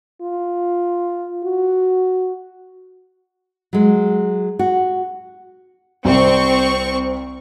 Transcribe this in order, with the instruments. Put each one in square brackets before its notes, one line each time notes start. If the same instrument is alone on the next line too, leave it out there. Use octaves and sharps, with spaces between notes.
[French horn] F4
F#4
[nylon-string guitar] F#3 G#3
F#4
[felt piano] C2 [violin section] C4 C#6